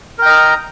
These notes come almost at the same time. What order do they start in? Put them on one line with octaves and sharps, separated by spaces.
A#4 G5 D#5 A#5